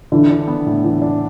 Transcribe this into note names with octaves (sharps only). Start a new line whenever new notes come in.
D3 E3
D4
B3
A2
E3
D4